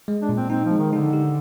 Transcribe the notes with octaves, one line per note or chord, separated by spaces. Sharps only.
G#3
D4
A#2
C4
C4 D#4
F3
G#3
D#3
D3 D#4
G4